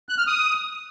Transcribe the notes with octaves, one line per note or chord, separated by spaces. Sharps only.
F#6
F6
D#6